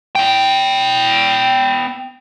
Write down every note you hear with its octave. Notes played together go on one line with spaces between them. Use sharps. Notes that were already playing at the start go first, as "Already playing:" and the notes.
B3 G5